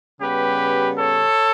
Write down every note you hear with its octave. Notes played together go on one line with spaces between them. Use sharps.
C#3 G3 B3 G4 B4
A4 C#5